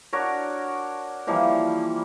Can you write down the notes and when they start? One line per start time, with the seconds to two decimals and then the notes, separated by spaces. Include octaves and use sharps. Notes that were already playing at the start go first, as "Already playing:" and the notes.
0.13 D4 F#4 A#4 C#5
1.27 E3 F3 G3 A#3